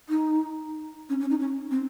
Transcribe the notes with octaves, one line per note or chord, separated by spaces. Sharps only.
D#4
C#4
C#4
D#4
C#4
C4